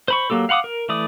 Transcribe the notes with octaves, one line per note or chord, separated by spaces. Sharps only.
C5 B5 C#6
F#3 A#3 G4 A4
F5 F#5 B5 D6 D#6
A#4
E3 A3 D5 D#6